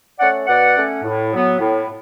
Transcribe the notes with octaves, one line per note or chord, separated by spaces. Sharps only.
A3 C#4 D5 F#5
B2 D5 F#5
A3 C#4
A2
F#3 B3
A2